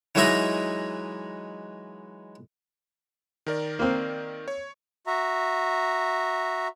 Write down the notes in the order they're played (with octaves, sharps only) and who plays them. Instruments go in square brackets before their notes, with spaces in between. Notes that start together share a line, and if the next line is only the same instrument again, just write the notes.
[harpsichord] E3 F#3 G#3 D#4 E5 A#5
[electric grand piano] D#3 A#4 D5
[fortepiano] A#3 C4
[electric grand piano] C#5
[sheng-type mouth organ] F#4 E5 A#5